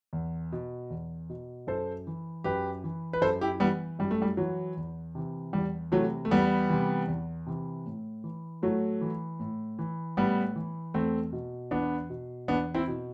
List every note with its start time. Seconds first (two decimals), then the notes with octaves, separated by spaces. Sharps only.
0.13 E2
0.52 B2
0.90 E2
1.30 B2
1.67 F#2 A4 C5
2.07 E3
2.44 F#2 G4 B4
2.84 E3
3.13 B4
3.21 F#2 A4 C5
3.41 E4 G4
3.60 E3 G3 B3
3.99 F#2 G3
4.11 A3
4.22 G3
4.37 E3 F#3
4.77 E2
5.15 C3 E3
5.53 E2 G3
5.92 C3 E3 F#3 A3
6.25 A3
6.31 E2 G3 B3
6.69 C3 E3
7.08 E2
7.47 C3 E3
7.86 A2
8.24 E3
8.62 A2 F#3 A3
9.01 E3
9.39 A2
9.79 E3
10.17 A2 G3 B3
10.56 E3
10.94 E2 A3 C4
11.33 B2
11.71 E2 B3 D4
12.10 B2
12.48 E2 B3 D4
12.74 C4 E4
12.88 B2